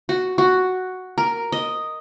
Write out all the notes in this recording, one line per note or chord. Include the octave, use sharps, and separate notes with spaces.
F#4
F#4
A#4
D#5